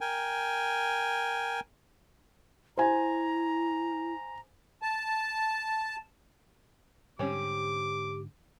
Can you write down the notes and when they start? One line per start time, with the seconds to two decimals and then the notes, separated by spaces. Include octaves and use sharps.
0.01 A#4 G5 G#5
2.77 E4 C5 G#5 A#5
4.82 A5
7.19 G#2 D3 G3 C4 C#4 G4 D6